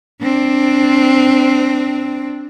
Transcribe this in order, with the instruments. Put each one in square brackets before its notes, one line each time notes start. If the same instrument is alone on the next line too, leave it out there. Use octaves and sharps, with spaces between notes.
[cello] C4 D4